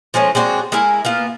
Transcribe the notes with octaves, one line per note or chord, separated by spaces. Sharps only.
F3 G#3 A3 C#4
G#3 C4 D4 F#4
G#3 E4 A#4 G#5
A#3 B3 F4